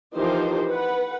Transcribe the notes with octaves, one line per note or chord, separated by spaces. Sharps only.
E3 F3 D#4 G4 A#4 C5
B4 F#5